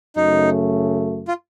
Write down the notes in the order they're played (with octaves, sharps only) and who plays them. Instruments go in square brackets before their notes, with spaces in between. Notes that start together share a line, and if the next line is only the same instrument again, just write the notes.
[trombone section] F#2 C#3 A3 [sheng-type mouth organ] D#4
[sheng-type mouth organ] F4